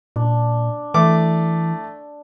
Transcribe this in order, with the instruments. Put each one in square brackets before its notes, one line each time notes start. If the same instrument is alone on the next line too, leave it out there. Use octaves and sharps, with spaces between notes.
[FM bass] A#2 [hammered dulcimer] D4
[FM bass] E3 [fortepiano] A3 D6